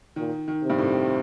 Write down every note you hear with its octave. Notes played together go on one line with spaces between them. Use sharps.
A#2 D#3
D#3
C3
G2
A2